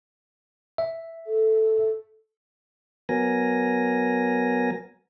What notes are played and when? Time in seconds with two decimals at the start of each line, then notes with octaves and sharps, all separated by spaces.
0.78 E5
1.27 A4
3.09 F#3 B3 A#4 G#5 A#6